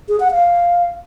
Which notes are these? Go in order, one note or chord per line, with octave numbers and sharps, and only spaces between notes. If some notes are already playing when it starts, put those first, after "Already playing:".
G#4
F#5
F5